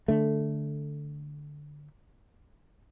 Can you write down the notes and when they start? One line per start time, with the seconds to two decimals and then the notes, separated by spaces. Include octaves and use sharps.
0.08 D3 A3